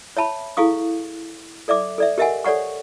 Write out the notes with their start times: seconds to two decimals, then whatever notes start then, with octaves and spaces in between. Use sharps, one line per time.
0.17 C#5 E5 A5 B5
0.57 E4 G#4 A4 F5 C#6 D#6
1.68 A4 D5 E5 D6
1.98 A4 D5 E5
2.18 G4 A#4 D#5 E5 F#5 G#5
2.45 A4 C#5 D5 F#5 C#6